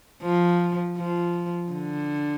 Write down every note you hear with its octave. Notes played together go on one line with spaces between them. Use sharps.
F3
F3
D3